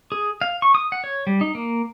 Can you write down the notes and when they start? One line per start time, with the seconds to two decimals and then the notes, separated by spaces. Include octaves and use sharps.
0.12 G#4
0.41 F5
0.62 C#6
0.75 D#6
0.92 F#5
1.04 C#5
1.27 G3
1.41 D#4
1.55 A#3